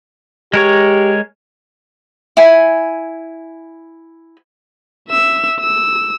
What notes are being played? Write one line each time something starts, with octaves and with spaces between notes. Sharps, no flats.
G#3 G4 A#4 C#5
E4 G#5
E5 E6
E6